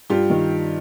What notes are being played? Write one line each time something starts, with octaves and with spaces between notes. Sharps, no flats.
G2 F4 G4
D#3